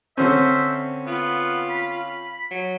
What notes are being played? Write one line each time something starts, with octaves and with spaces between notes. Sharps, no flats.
D3 C4 C#4 C5 E5
B3 F4
B5
F#3